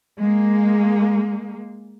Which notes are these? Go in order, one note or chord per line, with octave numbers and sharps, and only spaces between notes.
G#3 A#3